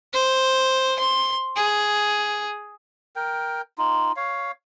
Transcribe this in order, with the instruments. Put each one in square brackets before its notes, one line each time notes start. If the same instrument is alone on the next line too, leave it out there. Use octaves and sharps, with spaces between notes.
[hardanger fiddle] C5
C6
G#4
[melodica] A#4 G5
D#4 F4
C#5 F5